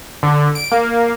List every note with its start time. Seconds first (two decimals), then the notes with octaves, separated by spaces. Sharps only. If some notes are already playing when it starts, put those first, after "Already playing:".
0.23 D3
0.55 D7
0.72 A#3